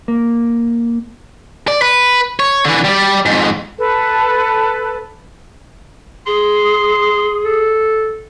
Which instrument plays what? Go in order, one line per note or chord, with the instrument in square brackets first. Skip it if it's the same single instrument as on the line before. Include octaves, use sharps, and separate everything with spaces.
[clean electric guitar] A#3
[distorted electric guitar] D5
B4
C#5
D3 E3
G3 D5
F2 G#2
[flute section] A4 B4
[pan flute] G#4 [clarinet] C6
[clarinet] A4